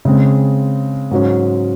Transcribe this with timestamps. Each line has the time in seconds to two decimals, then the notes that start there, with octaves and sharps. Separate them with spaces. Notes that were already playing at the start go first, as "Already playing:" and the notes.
0.05 C#3 G#3 C4
1.11 G#2 F#3 C#4